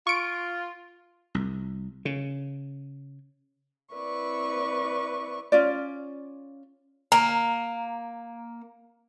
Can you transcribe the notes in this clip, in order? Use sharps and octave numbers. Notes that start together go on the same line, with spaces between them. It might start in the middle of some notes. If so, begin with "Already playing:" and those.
F4 C#6 D7
C2
C#3
C4 E4 B4 D5 C#6
C#4 F4 D5
A#3 A#5